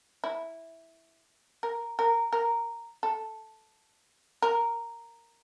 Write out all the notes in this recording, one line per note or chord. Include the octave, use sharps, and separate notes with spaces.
E4
A#4
A#4
A#4
A4
A#4